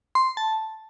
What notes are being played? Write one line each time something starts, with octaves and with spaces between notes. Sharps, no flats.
C6
A5